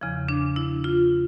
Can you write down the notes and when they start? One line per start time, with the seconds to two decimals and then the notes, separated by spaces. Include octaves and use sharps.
0.01 E2 C#3 F3
0.29 D4
0.56 E4
0.84 F4